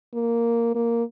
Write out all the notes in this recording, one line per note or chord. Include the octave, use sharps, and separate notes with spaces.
A#3
A#3